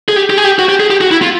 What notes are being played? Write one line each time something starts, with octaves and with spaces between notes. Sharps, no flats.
G#4
G4
G4
G#4
G4
F#4
G4
G#4
G4
F#4
E4
F4